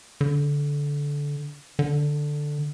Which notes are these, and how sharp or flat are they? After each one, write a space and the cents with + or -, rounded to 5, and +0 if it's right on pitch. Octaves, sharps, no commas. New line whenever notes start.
D3 -20
D3 +5